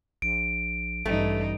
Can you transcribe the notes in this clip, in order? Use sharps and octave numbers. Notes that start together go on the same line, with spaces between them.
A#1 D7
A1 G2 A3 D#4